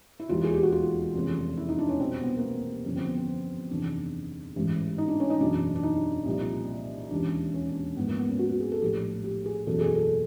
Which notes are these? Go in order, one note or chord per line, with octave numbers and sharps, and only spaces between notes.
E4
E1 D#2 D#3 F4
G#4
G4
F#4
F4
F1 E2 C#3
E4
D#4
D4
C#4
C2 B2 C4
B3
A#3
B3
G1 F2 C#3 F3 C#4
C4
B3
C4
F#1 E2 C3 D#3 D4
A1 G#2 E3
D#4
D4
C#4
D#4
F#1 E2 B2 D4
D4
D#4
C2 A#2 F3
E1 D#2 C#3 E3 D4
C#4
D4
C#4
G#1 G#2 F3 B3
A#3
B3
C#4
F#4
F#4
G#4
A4
A#1 A2 F3 G4
G4
G#4
F#1 E2 B2 A4
G#4
A4